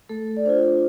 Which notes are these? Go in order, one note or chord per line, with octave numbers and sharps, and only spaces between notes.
A3 A4
D5
D4 F4 C5